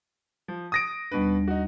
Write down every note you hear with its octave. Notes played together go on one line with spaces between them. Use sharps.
F3
D#6 A#6 D7
D#2 B2 G3 D4 B4
D#4 F#4